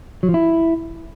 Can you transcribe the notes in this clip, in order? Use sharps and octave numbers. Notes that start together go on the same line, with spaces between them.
F#3
F3
E4